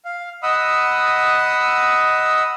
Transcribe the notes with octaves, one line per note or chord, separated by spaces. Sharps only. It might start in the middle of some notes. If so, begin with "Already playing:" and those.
F5
D#5 F#5 B5 D#6 E6